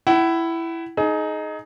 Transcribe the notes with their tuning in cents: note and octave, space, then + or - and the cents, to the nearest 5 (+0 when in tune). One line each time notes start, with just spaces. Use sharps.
E4 +10 F#5 +40
D#4 +0 G#4 +30